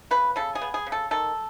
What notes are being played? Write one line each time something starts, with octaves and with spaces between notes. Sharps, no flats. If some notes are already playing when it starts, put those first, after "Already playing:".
C#3 B4
C#3 A4
G#4
B3
G#4
C#3
A4
D#3 A4